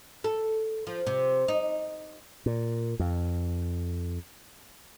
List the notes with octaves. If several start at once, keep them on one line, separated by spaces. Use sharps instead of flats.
A4
F3
C3
D#4
A#2
F2